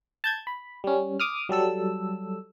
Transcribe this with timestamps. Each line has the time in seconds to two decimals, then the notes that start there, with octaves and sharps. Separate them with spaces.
0.24 A5 G6 G#6
0.47 B5
0.84 G3 C#4
1.20 D6 D#6 F6
1.49 F#3 G3 A4 E6